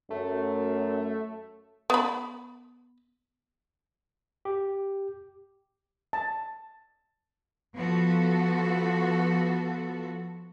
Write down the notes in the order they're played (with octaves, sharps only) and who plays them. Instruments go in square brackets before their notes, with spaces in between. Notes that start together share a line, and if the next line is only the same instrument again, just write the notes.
[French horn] F#2 [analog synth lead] A3
[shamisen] B3 B5
[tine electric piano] G4
[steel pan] A5
[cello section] F3 B3 F#4 A4